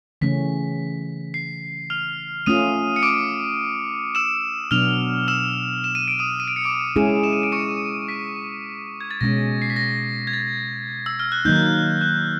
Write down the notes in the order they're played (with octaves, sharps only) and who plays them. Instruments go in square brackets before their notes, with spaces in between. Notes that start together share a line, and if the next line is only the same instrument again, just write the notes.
[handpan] C#3 E3 A3 C#4 [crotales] B6
[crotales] C7
F6 F7
[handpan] A3 C#4 F4 [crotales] D#6 D#7
[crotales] C#7
D6 D7
E6 E7
[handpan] B2 F#3 B3 D4 [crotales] F6 F7
[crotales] E6 E7
E7
D#7
D7
D#6 D#7
D#7
D7
C#7
D6 D7
[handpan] G#3 C#4 E4 G#4
[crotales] E7
D#7
D7
C#6 C#7
B6
G#6
A6
[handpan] B2 G#3 C#4 [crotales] A#6
[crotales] C7
B6
A#6
G#6
A6
E6
F6
F#6
[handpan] D#3 F#3 A#3 D#4 [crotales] G6
[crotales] F#6